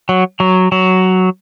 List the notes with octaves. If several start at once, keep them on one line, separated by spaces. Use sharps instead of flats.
F#3
F#3
F#3